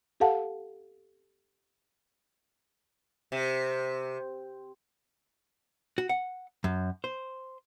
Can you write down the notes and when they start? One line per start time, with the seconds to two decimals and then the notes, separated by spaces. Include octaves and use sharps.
0.20 G4 A4 F5 F#5 A5
3.32 C3
5.98 F#4
6.09 F#5
6.64 F#2
7.04 C5